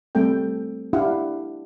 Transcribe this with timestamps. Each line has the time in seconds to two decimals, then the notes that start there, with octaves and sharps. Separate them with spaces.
0.15 G3 A3 C4 A4 G5
0.93 D4 E4 G4 F5 F#5